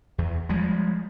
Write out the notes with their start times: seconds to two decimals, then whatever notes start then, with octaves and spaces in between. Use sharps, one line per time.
0.18 E2
0.49 F3 G3 G#3